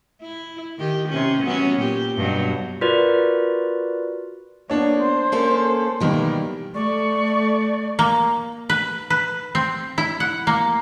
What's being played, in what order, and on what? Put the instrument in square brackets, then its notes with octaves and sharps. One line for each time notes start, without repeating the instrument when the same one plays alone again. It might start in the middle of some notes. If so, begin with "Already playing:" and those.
[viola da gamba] E4
D#3 G4
C3 C#4
F#3 B3 C#4
A#2 G4
G2 B2 F#3
[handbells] F4 F#4 A#4 B4 D5
[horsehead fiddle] A#3 B3 [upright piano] D4 C#5
[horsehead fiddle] C5
[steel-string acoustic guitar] A#3 C#4 A4
[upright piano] B2 D#3 A#3 [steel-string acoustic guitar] E3 G3
[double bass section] A3 [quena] D5 [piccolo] C#6
[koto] A#3
B4
B4
C4
E4
F#5
A#3